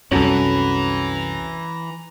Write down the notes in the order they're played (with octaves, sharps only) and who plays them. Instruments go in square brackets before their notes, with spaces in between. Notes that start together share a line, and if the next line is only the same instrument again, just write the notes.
[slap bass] C2 F#2 [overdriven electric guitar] E3 [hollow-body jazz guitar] C#4 F#4 A4 [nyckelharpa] A#5